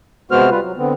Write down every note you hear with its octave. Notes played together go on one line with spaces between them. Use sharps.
C3 G#3 B3 F#4 C5 F6
G3 F4 B4
F#3
D3 B3 C4